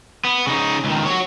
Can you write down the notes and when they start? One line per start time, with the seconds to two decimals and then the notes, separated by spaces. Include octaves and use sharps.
0.25 B3
0.47 C#3 D#4
0.84 C#2 D#3
1.06 F#4 C#5